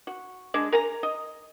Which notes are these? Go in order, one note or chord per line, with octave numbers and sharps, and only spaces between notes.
F#4
G#3 D4
A#4 G#5 A#5
D#5